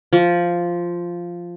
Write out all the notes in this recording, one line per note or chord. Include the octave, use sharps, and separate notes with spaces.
F3